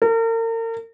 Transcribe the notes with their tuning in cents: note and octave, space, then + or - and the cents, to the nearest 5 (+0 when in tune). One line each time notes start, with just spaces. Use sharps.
A#4 -40